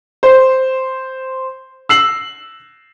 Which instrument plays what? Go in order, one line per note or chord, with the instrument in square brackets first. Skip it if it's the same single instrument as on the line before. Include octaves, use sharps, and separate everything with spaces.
[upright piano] C5
E6 C7 F#7